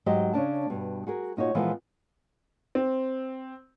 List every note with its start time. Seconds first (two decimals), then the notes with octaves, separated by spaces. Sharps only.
0.06 G#2 F#3 G4 C5 D#5
0.33 C#3 C#4 D4 A5
0.70 G2 B2
1.07 F#4 G#4 A#4
1.37 A#2 D#4 F#4 C#5
1.55 A#2 E3 F3 G#3 A#3 B3
2.75 C4